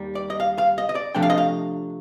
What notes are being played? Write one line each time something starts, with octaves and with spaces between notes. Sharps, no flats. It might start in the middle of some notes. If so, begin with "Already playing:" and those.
Already playing: D#2 D#3 G3
D5
D#5
F5
F5
D#5
D#5
D5
C3 F3 A3 D4 G5
F5
D#5
F5